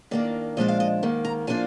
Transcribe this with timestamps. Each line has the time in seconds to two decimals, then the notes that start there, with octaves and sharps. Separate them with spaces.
0.11 D#3 A#3 D4 D5
0.57 A#2 F3 G#3 D4 D#5
0.68 F5
0.80 D#5
1.03 G#2 D#3 A#3
1.25 A#5
1.47 A#2 F3 A#3 D4 F4 G#5